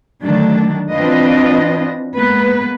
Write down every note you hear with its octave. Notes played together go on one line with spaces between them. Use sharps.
D3 D#3 F#3 A3 D4
E3 C4 D4 F4 B4 D#5
G#3 A#3 B3 B4